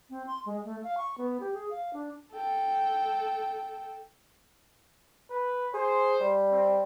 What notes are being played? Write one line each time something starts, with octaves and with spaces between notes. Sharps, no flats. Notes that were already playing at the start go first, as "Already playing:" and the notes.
C4
C6
G#3
A3
F5
C#6
B3
G4
G#4
F5
D4
A4 G5
B4
G#4 C5
G3
C4